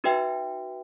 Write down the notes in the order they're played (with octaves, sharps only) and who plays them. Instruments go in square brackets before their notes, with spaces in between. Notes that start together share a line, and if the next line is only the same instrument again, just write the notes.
[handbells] D#4 F#4 B4 E5 G5